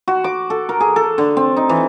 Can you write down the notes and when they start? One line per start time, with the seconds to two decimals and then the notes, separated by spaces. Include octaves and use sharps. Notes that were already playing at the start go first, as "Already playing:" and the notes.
0.08 F#4
0.24 D6
0.50 A4
0.69 A#4
0.80 G#4
0.96 A4
1.18 D3
1.37 C4
1.57 D#4
1.69 E3